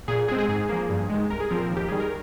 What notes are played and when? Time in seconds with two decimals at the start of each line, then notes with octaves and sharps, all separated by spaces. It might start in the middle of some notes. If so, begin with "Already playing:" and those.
0.08 A#2 G#4
0.28 G#3 C4 G#4
0.38 G#4
0.49 G#2 G#4
0.69 F3 A#3
0.89 G2
1.10 D#3 G#3
1.30 C2 A#4
1.40 G#4
1.50 A#2 F3 C4 A#4
1.71 D#2
1.77 G4
1.88 D#3 G3 G#4
2.00 A#4